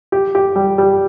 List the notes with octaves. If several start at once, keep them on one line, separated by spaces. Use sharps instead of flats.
G4
G4
G3
G3